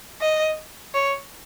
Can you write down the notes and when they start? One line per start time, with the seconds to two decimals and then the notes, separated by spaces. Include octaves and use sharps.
0.21 D#5
0.94 C#5